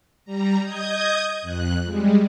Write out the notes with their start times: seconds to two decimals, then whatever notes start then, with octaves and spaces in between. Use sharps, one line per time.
0.25 G3 A#5
0.62 D#5 D#6 G6 G#6
1.42 F2 F#6
1.85 G3 G#3